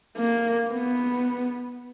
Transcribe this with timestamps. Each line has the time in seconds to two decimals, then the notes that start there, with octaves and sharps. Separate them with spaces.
0.17 A#3
0.71 B3